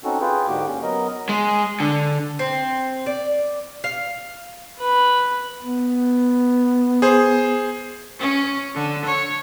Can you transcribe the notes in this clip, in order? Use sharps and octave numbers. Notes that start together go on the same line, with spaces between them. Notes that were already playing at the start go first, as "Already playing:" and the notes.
C4 C#4 D#4 F#4 A4
F4 G#4 B4 G5
G#2 D3 A#3 F#4 G4 D6
C#4
F#3 B3 A#4 D#5
G#3
D3
C4
D5
F5
B4 B5
B3
G#4 C5
C#4
D3
C#5